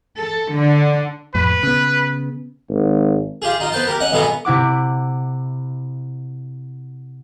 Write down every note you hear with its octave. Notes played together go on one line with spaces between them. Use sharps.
A4
D3
F2 A2 B4
C#3 B3
G#1
F4 G4 G#4
D#4 F4
B3 B4 C5 G5 A5
G4 A#4
C#4 D#5 F#5
G2 B2 B3 A4 G#5 A#5
C3 E4 F#5 D6